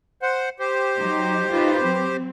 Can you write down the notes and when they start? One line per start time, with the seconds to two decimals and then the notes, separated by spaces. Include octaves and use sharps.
0.22 C5 F#5
0.59 G4 C5
0.98 F#3 D#4
1.52 D#4 F4 B4
1.84 F#3 C4